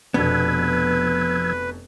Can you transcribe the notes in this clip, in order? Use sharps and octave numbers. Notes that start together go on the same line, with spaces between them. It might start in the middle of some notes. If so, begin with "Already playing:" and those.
F1 B2 F3 B3 D4 B4 E6 G#6